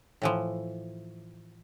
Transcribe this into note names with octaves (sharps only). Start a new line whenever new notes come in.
A2 E3 F3